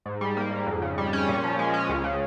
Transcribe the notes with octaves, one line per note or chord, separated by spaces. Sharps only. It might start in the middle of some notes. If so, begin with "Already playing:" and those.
G#2
G3
A#3
G#2
F2
C#3
G3
C#4
A#2
F3
G#3
C#4
C#2
C#3